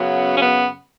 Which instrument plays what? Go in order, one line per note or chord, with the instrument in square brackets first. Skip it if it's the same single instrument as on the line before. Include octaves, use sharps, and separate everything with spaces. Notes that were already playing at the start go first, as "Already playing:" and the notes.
Already playing: [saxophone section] F#2 C#3 F#3 B3
C#4
B3